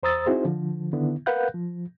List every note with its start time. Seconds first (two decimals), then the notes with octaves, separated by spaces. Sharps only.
0.03 E2 C5 A#5 D#6 E6 A6
0.26 C4 D#4 E4 F#4 G#4 C5
0.45 D3 F3
0.93 D3 D#3 B3 E4
1.26 A#4 B4 F5 F#5 F#6 G6
1.54 F3